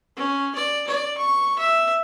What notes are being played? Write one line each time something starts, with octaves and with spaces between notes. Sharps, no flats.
C#4
D5
D5
C#6
E5